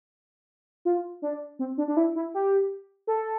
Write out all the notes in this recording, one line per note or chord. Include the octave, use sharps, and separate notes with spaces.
F4
D4
C4
D4
D4
E4
E4
G4
A4